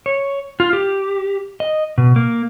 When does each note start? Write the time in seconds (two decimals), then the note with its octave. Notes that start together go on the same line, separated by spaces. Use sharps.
0.06 C#5
0.60 F4
0.73 G4
1.60 D#5
1.98 B2
2.16 A#3